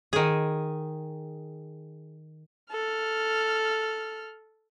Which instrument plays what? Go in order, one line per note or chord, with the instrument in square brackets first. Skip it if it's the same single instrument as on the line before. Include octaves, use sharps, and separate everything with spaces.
[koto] D#3 G#4
[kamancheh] A4 F6